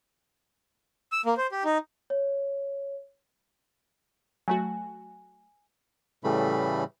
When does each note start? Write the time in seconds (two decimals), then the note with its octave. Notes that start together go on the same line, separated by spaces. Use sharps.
1.12 E6
1.26 A#3
1.37 C5
1.52 G4
1.64 D#4
2.10 C#5
4.48 F#3 A3 F#4 G#5
6.24 A2 C#3 E3 G3 A3 B5